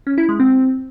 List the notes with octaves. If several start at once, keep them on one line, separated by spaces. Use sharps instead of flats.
C#4
E4
G#3
C4